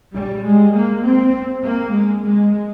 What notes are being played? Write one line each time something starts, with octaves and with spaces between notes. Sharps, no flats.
G3
G#3
A#3
C4
A#3
G#3
G#3